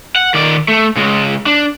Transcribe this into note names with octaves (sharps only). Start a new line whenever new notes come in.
F#5
D#3 D5
A3
C#3 G#3
D4